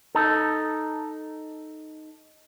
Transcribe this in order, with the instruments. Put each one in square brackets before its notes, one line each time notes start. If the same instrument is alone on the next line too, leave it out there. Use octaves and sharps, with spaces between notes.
[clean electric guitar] D#4 A4